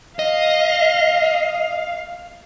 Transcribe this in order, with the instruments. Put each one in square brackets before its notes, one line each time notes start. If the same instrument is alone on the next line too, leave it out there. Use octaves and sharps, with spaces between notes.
[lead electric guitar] D#5 [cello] F5